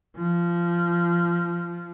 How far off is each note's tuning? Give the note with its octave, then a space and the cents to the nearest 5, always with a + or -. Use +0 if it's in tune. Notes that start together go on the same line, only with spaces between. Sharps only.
F3 -20